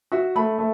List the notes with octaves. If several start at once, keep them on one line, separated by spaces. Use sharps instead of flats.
F#4 E5
A3 B5
A3